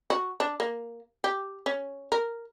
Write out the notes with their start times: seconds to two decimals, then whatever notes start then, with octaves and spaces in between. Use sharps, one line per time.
0.10 F#4
0.40 D4
0.60 A#3
1.24 G4
1.66 C#4
2.12 A#4